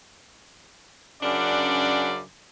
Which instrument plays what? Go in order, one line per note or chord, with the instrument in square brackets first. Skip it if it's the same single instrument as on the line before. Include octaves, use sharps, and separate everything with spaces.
[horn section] F#2 C#3 D4 D5 F#5